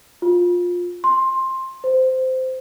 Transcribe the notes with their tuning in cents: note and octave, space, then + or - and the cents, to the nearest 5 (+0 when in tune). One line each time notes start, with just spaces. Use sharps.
F4 +20
C6 +15
C5 -15